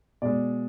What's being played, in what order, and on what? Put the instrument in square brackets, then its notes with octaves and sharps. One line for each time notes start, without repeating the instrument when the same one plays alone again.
[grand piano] B2 G#3 D5